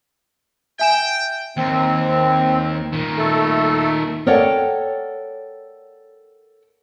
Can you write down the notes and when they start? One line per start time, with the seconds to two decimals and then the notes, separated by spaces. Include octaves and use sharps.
0.79 E5 G5 G#5 E7
1.57 D#2 C4
2.93 A#2 D#3
3.18 A3 A4
4.26 A4 A#4 C#5 D5 F#5 G5